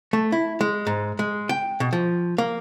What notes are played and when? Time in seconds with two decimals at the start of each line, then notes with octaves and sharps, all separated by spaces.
0.13 A3
0.32 E4
0.61 G#3
0.87 G#2
1.19 G#3
1.49 G5
1.80 B2
1.93 F3
2.38 A#3